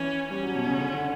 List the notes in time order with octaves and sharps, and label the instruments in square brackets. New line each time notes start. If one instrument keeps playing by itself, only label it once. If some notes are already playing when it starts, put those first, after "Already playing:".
Already playing: [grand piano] E3 [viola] C#4
[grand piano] G3 [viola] C#4
[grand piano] F#3
B2
C#3
D3
D3